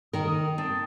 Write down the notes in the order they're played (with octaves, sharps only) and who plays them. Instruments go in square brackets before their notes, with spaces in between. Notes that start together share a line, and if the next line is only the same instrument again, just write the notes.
[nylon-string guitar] D#3 A#4 [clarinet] D#6
[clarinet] D#6
[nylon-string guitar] C4 [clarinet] A5